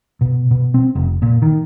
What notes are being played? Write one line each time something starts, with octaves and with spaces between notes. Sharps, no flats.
B2
B2
C4
F1
A#2
D#3